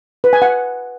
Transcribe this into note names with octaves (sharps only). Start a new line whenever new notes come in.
B4
G#5
F#5